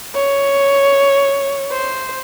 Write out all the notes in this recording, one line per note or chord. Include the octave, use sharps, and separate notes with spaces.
C#5
C5